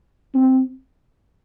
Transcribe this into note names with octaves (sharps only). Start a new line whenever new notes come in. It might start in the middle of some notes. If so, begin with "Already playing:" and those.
C4